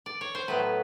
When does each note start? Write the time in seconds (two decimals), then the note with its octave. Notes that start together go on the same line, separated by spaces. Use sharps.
0.06 D5
0.21 C#5
0.35 C5
0.48 A2 F#3 B3 B4